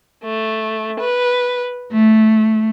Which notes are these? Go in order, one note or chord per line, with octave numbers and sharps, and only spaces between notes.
A3
B4
A3